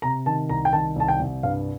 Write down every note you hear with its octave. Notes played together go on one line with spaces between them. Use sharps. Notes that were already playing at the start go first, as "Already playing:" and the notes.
C3 A#5
D#3 A5
C2 A#5
G5
D#3 A5
C2 A5
G5
C2
G2 F5